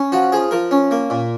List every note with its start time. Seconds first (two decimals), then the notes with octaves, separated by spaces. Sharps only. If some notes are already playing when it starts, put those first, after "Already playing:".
Already playing: C#4
0.12 F3 F#4
0.32 F3 G#4
0.51 F3 A#4
0.71 C#4
0.91 A#3
1.10 A#2